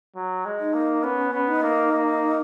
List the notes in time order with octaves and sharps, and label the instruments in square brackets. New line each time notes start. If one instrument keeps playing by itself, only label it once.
[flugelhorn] F#3
G#3
[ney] D#4
[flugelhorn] A#3
[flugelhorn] B3 [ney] C#4
[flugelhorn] B3
[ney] D#4
[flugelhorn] A#3
A#3